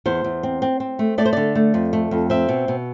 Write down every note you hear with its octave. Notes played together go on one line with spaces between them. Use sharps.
E2 C5
E2
C4
C4
C4
A3
A3 D5
C5
D3 D5
A3
F2
A3
F2
C4 E5
B2
B2